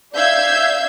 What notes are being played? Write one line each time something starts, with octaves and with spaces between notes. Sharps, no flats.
D5 E5 F5 E6 G6 G#6